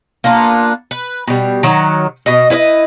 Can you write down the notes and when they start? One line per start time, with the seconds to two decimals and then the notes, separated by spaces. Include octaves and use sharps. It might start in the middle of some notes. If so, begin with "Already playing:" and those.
0.24 A#3 B3 D4 F4
0.91 B4
1.28 B2 G3
1.63 D#3 F#3
2.26 B2 D#5
2.50 E4 B4 C#5 D#5